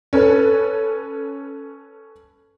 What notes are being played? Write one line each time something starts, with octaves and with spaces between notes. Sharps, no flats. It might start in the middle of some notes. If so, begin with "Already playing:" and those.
C#4 A4 B4